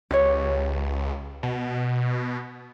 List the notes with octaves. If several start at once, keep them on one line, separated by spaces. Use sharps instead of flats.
C#2 G4 B4 C#5
B2